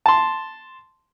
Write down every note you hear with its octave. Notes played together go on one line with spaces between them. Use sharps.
A5 C6